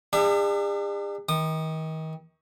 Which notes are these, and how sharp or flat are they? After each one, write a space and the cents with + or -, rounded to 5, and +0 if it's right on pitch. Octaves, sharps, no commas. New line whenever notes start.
D4 +35 G#4 -45 E5 +35
D#3 +35 D#6 -30